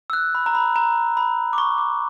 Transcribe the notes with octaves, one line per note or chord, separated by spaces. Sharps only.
E6
F#6
B5
A#5
B5
A#5
B5
D6
C#6
D6